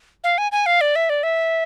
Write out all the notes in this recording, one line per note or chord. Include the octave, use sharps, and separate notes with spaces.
F5
G#5
G#5
F5
D5
E5
D5
E5